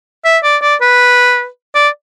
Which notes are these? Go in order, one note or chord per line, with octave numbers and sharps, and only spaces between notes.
E5
D5
D5
B4
D5